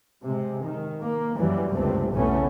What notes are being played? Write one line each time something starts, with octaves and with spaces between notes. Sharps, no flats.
C3 G#3
D#3
A#3
F#2 E3 F#3 G3
G1 C#2 G2 C3 A3 C4
B1 E2 C#3 A3 B3 C#4